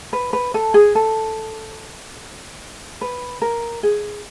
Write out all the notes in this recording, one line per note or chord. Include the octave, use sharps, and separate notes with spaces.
B4
B4
A4
G#4
A4
B4
A#4
G#4